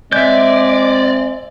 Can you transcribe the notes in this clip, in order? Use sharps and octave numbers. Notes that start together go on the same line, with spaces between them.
G#3 C4 D5 E5 G6